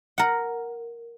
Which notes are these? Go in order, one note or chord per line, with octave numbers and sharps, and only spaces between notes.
A#4 F#5